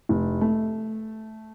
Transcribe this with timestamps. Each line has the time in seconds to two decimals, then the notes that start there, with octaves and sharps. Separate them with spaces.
0.09 F1
0.41 A3